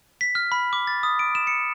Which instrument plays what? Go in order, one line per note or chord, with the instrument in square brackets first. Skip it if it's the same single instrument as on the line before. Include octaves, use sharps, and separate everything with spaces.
[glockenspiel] B6
F6
B5
D6
A6
D#6
D7
E7
C#7